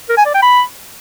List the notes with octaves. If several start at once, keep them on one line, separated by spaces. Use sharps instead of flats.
A#4
G#5
D5
G5
B5